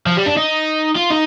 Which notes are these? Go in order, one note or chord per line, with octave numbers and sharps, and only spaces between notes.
F3
G3
D4
D#4
F4
D#4